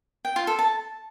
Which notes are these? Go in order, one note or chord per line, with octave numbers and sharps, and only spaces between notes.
G5
F4
A4
A5